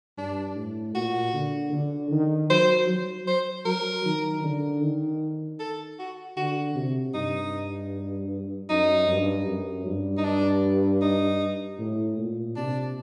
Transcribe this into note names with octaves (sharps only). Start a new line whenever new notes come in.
G2 D4
A2
A#2 F#4
D3
D3
D#3
F#3 C5
F#3
C5
F#3 A#4
D#3
D3
D#3
A4
F#4
D3 F#4
C3
G2 D#4
F#2 D#4
G2
F#2
G2
D#4
D4
D#4
A2
A#2
C3 D4